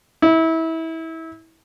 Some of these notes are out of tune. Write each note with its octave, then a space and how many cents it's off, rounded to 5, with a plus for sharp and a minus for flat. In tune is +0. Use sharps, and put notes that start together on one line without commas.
E4 -25